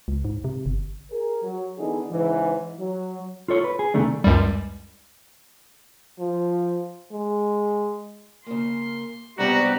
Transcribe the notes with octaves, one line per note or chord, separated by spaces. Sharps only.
C#2
G#2
C3
G1
G#4 A#4
F#3
D3 E3 B3 D#4 G#4
G#2 C#3 E3
F#3
F4 A4 C#5
B4
G#4
C2 C3 D#3 A3 D4
C#2 F#2 G3
F3
G#3
C#3 A#3 C6
G#2 C3 G3 B3 D4 F#4 G4 A#5